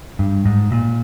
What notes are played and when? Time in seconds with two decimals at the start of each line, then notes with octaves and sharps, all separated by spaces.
0.19 G2
0.45 G#2
0.72 A#2